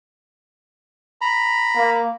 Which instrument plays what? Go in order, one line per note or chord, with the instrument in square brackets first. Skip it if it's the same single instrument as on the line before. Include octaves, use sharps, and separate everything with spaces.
[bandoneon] A#5 B5
[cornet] A#3